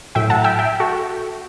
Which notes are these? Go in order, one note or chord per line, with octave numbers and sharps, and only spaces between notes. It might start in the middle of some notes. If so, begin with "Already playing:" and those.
A2 F#3 E5 G5
F#5 A5
E5 G5
E5 G5
F#4 A4